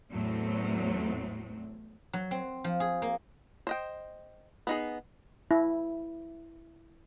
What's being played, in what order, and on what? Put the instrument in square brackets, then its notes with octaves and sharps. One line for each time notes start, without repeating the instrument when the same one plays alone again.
[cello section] E2 A2 F#3 A3 C4
[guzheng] F#3
C4
F3
G#4
A#3
[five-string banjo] C5 D#5 G5
B3 D#4 G#4
[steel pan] E4